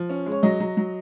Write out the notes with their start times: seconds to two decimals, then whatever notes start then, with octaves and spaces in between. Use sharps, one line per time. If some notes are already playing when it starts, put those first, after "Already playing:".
Already playing: F3
0.10 C#4
0.26 G#3
0.32 C#5
0.43 F#3 D#5
0.60 F#3
0.77 F#3